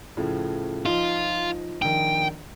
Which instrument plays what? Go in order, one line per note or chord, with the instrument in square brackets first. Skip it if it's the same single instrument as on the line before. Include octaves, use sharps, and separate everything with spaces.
[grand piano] A2 C#3 F3
[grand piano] F3 D#4 [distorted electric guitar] F4
[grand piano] A#1 D#3 [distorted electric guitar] G5